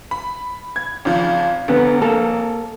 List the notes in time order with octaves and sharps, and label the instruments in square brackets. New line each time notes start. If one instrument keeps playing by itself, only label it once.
[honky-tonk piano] B5
G#6
G#1 C#3 F3
[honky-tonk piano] F1 [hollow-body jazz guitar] D3 B3
[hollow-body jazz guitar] A#3 A4